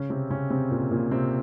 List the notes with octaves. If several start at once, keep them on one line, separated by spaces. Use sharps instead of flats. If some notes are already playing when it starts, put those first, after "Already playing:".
Already playing: C#3 C#4
C3 C4
C#3 C#4
C3 C4
A#2 A#3
A#2 A#3
C3 C4